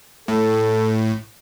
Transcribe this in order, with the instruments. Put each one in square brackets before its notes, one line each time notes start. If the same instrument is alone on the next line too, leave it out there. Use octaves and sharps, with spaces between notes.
[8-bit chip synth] A2 [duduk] A4